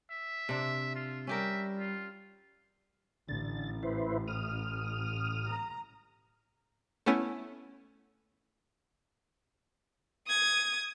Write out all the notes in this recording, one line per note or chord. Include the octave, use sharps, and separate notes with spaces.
E5
C3 D4
F4
G3 C#4 G4 A#4 E5
F4
A1 D3 A6
E4 B4 C5
D#6 F6
A#5
A3 B3 C#4 E4
D#6 G#6